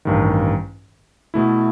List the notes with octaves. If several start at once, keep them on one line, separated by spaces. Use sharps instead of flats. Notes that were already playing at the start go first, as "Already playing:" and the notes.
A1 G2 D#3
B2 A3 E4